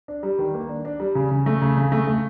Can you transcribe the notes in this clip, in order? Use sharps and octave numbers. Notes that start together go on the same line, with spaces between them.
D4
G3
D#3
A#3
D4
D4
G3
C#3
C#3
A3
C#3
C#3
A3
A3